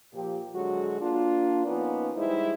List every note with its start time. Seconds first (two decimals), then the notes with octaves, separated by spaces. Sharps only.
0.14 A#2 F3 G4
0.54 D3 F#3 G#3 F#4
1.01 A#3 D4 F4
1.66 F3 A#3 B3 C#4 D#4
2.15 E3 G3 G#3 D#4 E4 C5